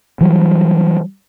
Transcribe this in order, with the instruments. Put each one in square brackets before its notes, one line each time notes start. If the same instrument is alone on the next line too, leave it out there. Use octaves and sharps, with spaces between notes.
[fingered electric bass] E3 F#3 G3